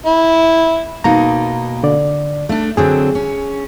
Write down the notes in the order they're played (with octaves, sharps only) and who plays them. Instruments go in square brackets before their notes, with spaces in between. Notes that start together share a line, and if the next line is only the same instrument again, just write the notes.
[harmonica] E4
[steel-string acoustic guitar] B2 A#3 D#4 [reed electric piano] A#5
[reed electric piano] D3 D5
[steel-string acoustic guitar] A3 D4
[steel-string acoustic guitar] D3 F#3 C4 [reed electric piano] G#4
[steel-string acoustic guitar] C#4